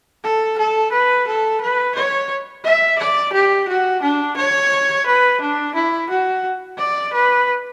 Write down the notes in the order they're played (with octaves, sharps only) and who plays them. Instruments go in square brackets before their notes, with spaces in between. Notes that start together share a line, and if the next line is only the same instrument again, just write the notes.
[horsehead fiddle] A4
A4
B4
A4
B4
C#5
E5
D5
G4
F#4
D4
C#5
B4
D4
E4
F#4
D5
B4